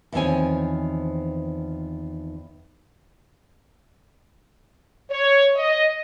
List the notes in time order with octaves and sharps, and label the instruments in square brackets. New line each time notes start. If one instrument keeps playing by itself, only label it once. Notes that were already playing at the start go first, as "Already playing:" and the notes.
[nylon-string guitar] E2 D#3 F3 C4 C#5 G#5
[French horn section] C#5
D#5